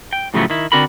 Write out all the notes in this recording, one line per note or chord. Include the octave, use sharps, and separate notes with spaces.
G5
A2 C#3 F3 F#3 A3 B3
D#3 E4
D3 C4 D4 F#4 A#4 B5